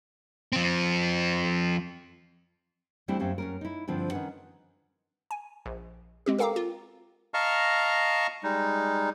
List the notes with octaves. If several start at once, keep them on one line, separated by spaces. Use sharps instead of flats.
F3 C4
E3 G3 A3 C4 D4 E4
F#2 C4 C#4 G4 F5
F#2 C#4 A#4
D#4 E4
G2 D3 F3 C4 D4 E4
D#3 C#4 D#4 B4 F#5
G#5
A#1
G#3 C4 G4
A4 A#4 F5 G5 A#5 D6
F4
D#5 F5 A5 A#5 C#6 F6
G3 G#3 D#4